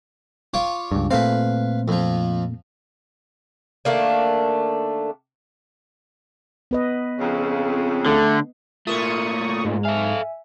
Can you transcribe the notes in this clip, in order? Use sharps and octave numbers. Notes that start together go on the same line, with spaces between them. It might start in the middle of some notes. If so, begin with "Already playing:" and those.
F4 C#5 D6
C#2 G2
A#2 A3 C4 B4 F5
F2 F3
D#3 A3 A#3 D4
B3 B4 D#5
F2 C#3
D3 A3
A#2 A3 F4 A#4 C#6 D#6
G#2
A4 E5 F5 G#5